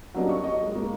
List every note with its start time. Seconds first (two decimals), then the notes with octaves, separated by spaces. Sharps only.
0.14 F#3 G3 A#3 C#4 D4 D#5
0.29 C#6
0.44 D#5
0.62 G#2 G#3
0.75 G#3 A#3